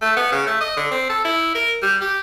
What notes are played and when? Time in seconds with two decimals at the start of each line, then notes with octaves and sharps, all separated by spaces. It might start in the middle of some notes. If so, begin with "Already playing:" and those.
0.02 A3
0.17 B3
0.32 C#3
0.47 A3
0.60 D#5
0.77 D3
0.91 C4
1.09 A4
1.25 E4
1.55 A#4
1.82 G3
2.01 G4